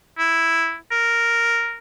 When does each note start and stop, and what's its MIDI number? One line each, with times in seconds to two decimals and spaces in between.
0.18 0.76 64
0.92 1.78 70